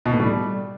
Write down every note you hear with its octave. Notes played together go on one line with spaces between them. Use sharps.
B2
A2
G3